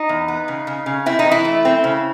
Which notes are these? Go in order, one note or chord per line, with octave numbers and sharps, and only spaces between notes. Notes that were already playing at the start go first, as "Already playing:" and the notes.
Already playing: D#4
E2
B3
C#3
C#3
C#3
C4 E4
D#4
E3
E4
A3
C4
C#3